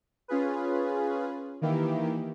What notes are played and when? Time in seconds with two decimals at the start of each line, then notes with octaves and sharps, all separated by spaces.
0.28 C#4 F4 G#4 B4
1.61 D#3 E3 A#3 E4 G4